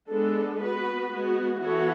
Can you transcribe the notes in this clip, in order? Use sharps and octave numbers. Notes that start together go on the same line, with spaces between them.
G#3 B3 D4 A4
B3 F#4 B4
G#3 B3 F#4
E3 B3 F#4 A4 C#5